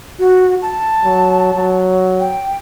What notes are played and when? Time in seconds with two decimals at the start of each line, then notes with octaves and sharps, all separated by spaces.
0.19 F#4
0.62 A5
1.04 F#3
1.55 F#3
2.20 G5